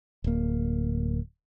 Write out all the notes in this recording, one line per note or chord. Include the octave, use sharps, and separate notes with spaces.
D1 A#3